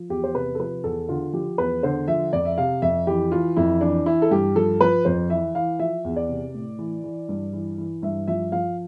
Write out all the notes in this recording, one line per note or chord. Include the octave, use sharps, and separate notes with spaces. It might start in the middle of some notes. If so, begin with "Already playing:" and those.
Already playing: F3
E2 G4
C5
C3 B4
A4
F3 B4
E2 A4
D3 F4
F3 G4
E2 B4
D3 C5
F3 E5
F2 D5
E5
C3 F5
F2 E5
E3 G4
E3 F4
F2 E4
E3 D4
E3 E4
A4
G2 G4
F3 A4
F3 B4
F2 C5
E3 E5
E3 F5
F3 E5
E2
D5
C3
A2
E3
E3
G2
E3
E3
G2 E5
F3 E5
F3 F5